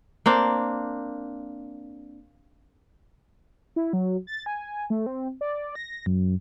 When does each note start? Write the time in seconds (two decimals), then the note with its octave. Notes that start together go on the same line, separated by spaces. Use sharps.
0.26 A#3 C4 D4
3.76 E4
3.93 F#3
4.27 A6
4.46 G#5
4.90 A3
5.06 C4
5.41 D5
5.75 A#6
6.06 F#2